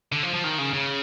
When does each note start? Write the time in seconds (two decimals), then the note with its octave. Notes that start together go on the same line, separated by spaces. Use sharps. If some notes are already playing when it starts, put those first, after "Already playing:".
0.12 D3
0.23 F3
0.34 F3
0.44 D#3
0.58 C#3
0.73 C#3